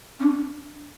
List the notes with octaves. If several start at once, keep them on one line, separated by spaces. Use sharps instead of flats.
C#4
D4